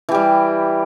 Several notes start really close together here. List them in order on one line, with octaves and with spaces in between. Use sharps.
E3 G4 G3